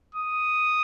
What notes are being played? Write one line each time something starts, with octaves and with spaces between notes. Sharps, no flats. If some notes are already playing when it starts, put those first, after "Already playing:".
D#6